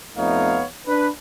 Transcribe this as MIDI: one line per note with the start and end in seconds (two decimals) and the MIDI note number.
0.16 0.64 41
0.16 0.64 57
0.16 0.64 59
0.16 0.64 63
0.16 0.64 73
0.16 0.64 77
0.87 1.08 62
0.87 1.08 71